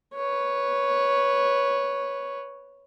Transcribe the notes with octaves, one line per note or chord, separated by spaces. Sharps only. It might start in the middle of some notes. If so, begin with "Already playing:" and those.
B4 C#5